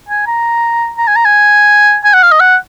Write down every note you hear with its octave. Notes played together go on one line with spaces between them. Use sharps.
G#5
A#5
A#5
G#5
A#5
G#5
G#5
F#5
F5
D#5
F#5